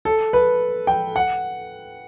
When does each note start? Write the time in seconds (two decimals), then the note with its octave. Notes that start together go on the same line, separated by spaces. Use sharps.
0.05 A4
0.33 B4
0.87 G5
1.16 F#5